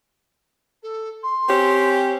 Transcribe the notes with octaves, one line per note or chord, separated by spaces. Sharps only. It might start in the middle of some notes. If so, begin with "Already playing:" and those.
A4
C6
C4 C#4 G4